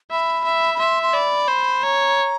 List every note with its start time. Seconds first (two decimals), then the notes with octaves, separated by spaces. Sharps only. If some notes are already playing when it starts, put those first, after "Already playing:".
0.11 E5 B5
0.45 E5
0.75 B5
0.80 E5 C6
1.03 C6
1.14 D5 B5
1.48 C5
1.83 C#5 A#5